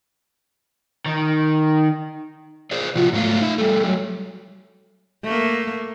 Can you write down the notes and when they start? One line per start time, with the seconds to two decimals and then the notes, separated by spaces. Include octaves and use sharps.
1.06 D#3
2.71 G#4 C5 D5
2.96 C3 F3 F4 F#4
3.13 G#2 F#3 A3 F4
3.41 D#4 E5
3.58 G3 A3 A4
3.85 F#3
5.24 A3 A#3